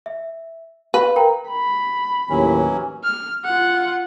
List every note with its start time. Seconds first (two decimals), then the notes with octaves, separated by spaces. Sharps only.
0.06 E5
0.94 B4 F5
1.16 A#4 G5 A#5
1.50 B5
2.30 D#2 A2 E3 F#3 C#4
3.04 F6
3.44 F4 F#5